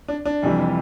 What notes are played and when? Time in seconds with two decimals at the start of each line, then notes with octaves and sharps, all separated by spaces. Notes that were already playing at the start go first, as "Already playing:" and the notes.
0.08 D4
0.25 D4
0.42 F1 F2 C3 E3 G3